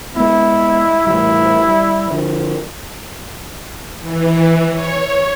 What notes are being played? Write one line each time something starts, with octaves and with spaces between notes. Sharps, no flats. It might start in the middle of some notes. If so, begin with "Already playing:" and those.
G#3 B3 E4
A2 E3 G3 E4
G3
D3 F3
E3
C#5